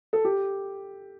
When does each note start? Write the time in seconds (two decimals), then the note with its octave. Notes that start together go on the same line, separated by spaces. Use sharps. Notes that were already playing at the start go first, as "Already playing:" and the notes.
0.13 A4
0.25 G4